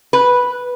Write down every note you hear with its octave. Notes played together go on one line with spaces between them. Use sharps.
B4